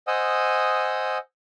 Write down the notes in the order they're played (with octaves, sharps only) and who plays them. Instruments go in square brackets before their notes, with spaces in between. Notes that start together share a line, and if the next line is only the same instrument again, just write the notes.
[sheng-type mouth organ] C5 D#5 F#5 G#5 D#6 E6